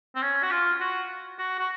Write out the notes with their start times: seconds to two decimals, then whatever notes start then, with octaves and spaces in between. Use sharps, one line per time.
0.15 C4
0.22 C#4
0.43 F#4
0.51 F4
0.81 F#4
1.39 F#4
1.59 F#4